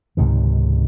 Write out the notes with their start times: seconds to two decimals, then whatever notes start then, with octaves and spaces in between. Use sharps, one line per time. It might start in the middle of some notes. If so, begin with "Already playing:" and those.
0.17 C#2 G#2 C3 D#3